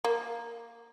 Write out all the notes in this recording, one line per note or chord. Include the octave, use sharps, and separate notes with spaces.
A#3